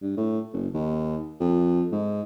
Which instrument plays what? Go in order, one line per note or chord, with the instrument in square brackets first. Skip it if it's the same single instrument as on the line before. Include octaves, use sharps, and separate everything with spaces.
[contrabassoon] G2
A2
F#1
D#2
F2
G#2